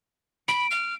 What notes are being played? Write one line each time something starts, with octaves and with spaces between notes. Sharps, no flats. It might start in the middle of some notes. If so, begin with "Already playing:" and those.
B5 D7
F6